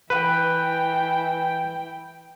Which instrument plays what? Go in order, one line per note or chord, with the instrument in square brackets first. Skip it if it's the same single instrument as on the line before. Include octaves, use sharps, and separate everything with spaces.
[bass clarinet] E3 [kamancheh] E4 G5 [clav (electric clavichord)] B4